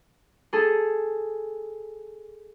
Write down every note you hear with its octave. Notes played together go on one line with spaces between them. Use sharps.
G#4 A4